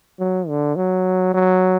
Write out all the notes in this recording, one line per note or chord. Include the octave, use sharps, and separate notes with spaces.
F#3
D3
F#3
F#3